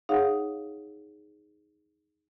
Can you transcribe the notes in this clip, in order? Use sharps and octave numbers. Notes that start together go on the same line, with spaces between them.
D#4 G#4 C#5 F5 F#5